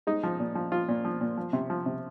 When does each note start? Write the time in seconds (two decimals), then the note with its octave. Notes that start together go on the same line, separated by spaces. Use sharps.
0.07 G#3 D#4
0.24 F3
0.40 A#2
0.55 F3
0.72 F3 F4
0.89 A#2
1.05 F3
1.21 A#2
1.38 F3
1.53 C3
1.70 F3
1.86 C3